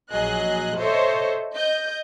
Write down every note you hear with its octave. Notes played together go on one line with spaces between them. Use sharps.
A#1 F#3 G#4 D#5 F#6
A4 C5 C#5 D#5 E5
D#5 G6